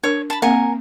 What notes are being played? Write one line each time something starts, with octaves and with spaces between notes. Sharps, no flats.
D4 A#4 C#5
A5 B5
A#3 C4 A#4 F#5 G#5